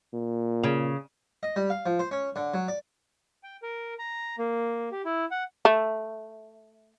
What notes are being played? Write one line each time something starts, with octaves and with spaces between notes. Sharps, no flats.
A#2
C#3
D#5
G3
F5
F3
C5
C#4
D3
F#3
D5
G5
A#4
A#5
A#3
G4
E4
F#5
A3